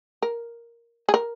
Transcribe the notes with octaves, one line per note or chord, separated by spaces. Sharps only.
A#4
G#4
A#4